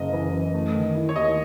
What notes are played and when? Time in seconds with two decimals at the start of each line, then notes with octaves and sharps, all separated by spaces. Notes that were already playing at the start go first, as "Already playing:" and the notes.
Already playing: F#1 D#5
0.13 E3
0.33 F#2
0.54 A3
0.75 D#3
0.95 E4
1.09 C#5
1.16 D#2 D#5